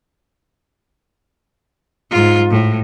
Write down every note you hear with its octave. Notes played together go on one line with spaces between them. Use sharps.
G#2 F4
A2